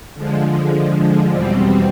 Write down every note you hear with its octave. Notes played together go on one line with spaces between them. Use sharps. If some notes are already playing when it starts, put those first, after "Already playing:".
D3 F3 G#3
E2 B2 G3 C4